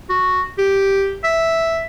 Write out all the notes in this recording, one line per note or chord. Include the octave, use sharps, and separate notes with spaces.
F#4
G4
E5